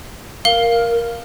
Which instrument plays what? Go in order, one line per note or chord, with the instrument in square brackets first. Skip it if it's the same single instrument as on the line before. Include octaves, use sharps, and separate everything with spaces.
[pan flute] A#4 [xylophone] F5 G7